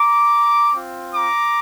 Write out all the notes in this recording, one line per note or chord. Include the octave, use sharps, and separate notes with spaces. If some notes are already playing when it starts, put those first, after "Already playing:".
Already playing: A#5 D6
C4 F4
A#5 D6